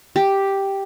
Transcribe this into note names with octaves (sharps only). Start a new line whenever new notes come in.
G4